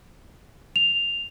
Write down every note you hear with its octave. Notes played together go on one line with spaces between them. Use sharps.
F7